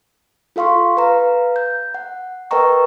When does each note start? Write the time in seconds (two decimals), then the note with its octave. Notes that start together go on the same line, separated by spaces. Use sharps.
0.56 F4 A4 F5 C6 C#6
0.97 B4 F5 A#5
1.56 G6
1.94 F#5
2.51 A#4 B4 D#5 G5 A#5 C#6